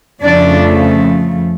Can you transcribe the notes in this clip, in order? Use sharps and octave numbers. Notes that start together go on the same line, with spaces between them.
F2 C#3 F3 A3 D4 D5